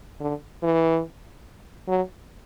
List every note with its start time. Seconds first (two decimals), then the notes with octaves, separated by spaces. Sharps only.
0.21 D3
0.63 E3
1.88 F#3